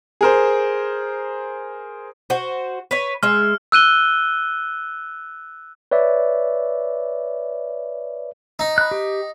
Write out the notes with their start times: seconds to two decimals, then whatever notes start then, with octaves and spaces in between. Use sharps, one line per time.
0.21 G#4 A#4 C5
2.30 F#4 C5
2.91 B4 C#5
3.23 G#3 E5 F6
3.72 E6 F#6 D#7 G7
5.91 B4 C#5 D5 E5
8.59 D#4
8.78 B5 F#6
8.91 G4